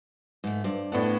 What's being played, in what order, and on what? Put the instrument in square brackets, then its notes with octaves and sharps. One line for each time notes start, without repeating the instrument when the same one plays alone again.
[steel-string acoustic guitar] G#2 A3
G2 C5 D5
[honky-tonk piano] A2 B3 D4